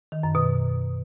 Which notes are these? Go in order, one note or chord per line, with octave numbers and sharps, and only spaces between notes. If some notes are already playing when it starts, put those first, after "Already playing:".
D#3
F#2
B2